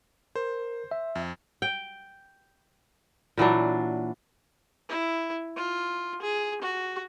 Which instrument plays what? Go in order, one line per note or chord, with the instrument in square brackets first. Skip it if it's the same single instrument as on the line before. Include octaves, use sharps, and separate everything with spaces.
[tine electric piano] A#4 [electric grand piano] C5
[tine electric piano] E5
[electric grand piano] F2
[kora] G5
A#2 E3 F#3 D4
[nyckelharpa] E4
F4
G#4
F#4